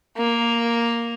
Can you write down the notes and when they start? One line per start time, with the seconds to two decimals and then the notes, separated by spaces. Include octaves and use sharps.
0.18 A#3